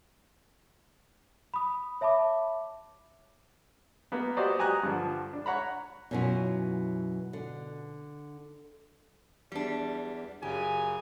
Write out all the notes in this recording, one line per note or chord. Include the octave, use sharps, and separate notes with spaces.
B5 D#6
C#5 E5 A5 B5 D6
A#3 B3
F#4 G4 B4 C5 D5 D#5
F#4 G4 G#5 A#5 D#6 F#6
G2 D3 F3
D4
C#5 F#5 A#5 B5
F#2 B2 E3 F#3 C#4 F4
D3
E2 G3 D4
F#2 C#3 G4 G#5